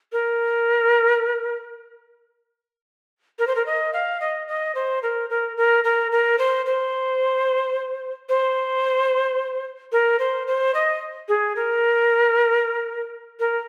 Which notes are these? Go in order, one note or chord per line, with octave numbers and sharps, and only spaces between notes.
A#4
A#4
C5
A#4
D#5
F5
D#5
D#5
C5
A#4
A#4
A#4
A#4
A#4
C5
C5
C5
A#4
C5
C5
D#5
G#4
A#4
A#4